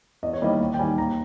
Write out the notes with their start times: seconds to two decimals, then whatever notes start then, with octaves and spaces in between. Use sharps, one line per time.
0.23 E2 D#5
0.33 C#5
0.42 D#3 G3 A#3 E4 D#5
0.60 D#2
0.74 G5
0.79 D#3 G3 G#5
0.98 D#2 A#5